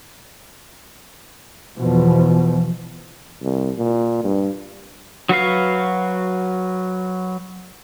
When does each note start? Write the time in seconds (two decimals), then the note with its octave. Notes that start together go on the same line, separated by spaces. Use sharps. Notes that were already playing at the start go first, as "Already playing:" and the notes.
1.77 E2 B2 F3
3.42 C2
3.78 A#2
4.24 G2
5.29 F#3 F#4 B4 F5